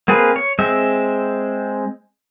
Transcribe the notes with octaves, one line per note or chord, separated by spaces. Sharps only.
A#3 C4 G#4 B4
C#5
G#3 C4 E5